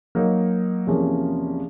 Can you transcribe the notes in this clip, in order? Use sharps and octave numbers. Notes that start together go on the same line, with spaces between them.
F#3 A#3 D#4
E2 C3 F3 A#3 C#4